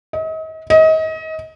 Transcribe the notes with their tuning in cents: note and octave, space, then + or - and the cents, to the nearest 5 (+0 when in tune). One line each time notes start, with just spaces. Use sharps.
D#5 +40
D#5 +30